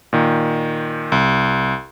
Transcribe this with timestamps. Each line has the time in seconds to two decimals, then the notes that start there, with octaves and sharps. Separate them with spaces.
0.13 A#2 D#3
1.12 C2